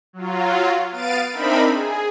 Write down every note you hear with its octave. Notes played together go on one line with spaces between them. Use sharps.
F#3 F4
B3 F5 A6 D7 D#7
C4 D4 D#4 A#4 E5 B5
G#4